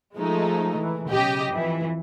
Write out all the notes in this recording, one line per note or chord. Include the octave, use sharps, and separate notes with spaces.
F3 G#3 A3 D#4
E3
B1 C#3 G4 D#5
F2 E3